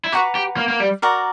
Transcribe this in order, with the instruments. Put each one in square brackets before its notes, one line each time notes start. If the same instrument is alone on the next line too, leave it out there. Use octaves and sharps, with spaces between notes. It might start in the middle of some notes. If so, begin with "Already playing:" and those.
[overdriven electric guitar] E4
[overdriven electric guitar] F#4 [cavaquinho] B4 F#5 A#5 D6
[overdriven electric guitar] G4
A#3
A#3
G3
[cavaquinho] F#4 A#4 D5 A#5